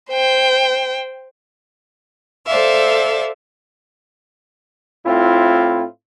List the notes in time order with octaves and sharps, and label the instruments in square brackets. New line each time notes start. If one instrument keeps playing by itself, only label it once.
[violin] C5 G5
[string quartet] A4 C5 D5 E5 F5
[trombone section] A2 C4 E4 F4